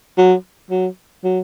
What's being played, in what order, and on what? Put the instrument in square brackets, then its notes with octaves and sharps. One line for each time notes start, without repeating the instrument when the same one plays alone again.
[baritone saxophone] F#3
F#3
F#3